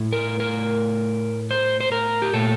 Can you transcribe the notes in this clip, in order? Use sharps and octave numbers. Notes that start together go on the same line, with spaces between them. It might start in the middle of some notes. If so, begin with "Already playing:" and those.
Already playing: A2 A3
A#4
A#4
C5
C5
A#4
G4
A#2 A3 A4